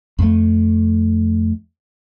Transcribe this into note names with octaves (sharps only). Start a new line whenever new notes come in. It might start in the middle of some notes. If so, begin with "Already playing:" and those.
F2 A3